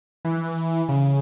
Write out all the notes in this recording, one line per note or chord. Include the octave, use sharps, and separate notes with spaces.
E3
C#3